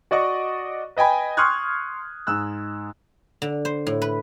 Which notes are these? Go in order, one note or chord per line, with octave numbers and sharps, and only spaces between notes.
F#4 D5 D#5 C#6
B4 D#5 G5 G#5 B5
C6 C#6 D#6 F6 F#6 G#6
G#2 E6 F#6
D3
C5
A2
B4